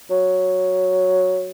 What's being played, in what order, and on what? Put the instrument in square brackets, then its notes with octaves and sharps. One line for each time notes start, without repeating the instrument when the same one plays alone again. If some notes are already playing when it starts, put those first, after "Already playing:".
[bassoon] F#3